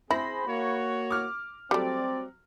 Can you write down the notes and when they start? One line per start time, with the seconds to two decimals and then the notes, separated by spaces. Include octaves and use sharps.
0.11 C4 E4 G#4 C5 B5 A#6
0.47 A#3 F#4 C#5
1.11 D6 F6
1.71 F#3 G3 A3 C4 D5